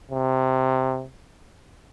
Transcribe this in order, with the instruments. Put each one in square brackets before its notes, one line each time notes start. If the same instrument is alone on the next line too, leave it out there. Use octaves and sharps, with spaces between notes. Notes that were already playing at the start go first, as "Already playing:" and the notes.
[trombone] C3